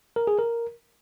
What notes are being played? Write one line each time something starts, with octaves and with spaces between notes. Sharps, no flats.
A#4
G#4
A#4